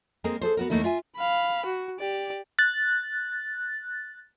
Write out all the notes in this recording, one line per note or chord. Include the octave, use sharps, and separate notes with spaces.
G#3 A#3 C4 G#4 A#4
G#4 A4 C5
B3 F#4 A#4
D#2 A3 A#3 D#4 E4
F4 E5 G#5
F5 B5
F#4
G4 D5
F#6 A6